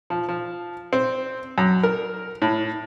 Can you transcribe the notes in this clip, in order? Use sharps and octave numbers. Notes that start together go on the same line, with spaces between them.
F3
F3
C4
F#2
A#4
A2